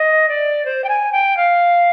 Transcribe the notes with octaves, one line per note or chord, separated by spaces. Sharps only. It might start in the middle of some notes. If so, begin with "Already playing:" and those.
Already playing: D#5
D5
C5
G5
G#5
G5
F5